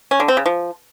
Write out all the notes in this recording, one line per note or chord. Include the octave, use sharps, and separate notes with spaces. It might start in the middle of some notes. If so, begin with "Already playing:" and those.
C#4
D3
C4
C#3
F3